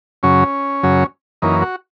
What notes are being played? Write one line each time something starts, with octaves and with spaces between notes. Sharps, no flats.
F#2 C#3 F#3 C#4
F#2 C#3 F#3
F#2 E3 A#3 C#4 D#4
F#4